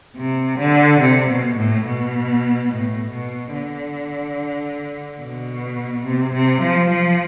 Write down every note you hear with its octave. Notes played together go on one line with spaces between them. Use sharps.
C3
D3
C3
B2
A2
B2
A2
B2
D3
B2
C3
C3
F3
F3